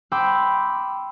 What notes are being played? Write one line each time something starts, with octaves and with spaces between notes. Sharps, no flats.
G5 B5 C6 D6 E6 G6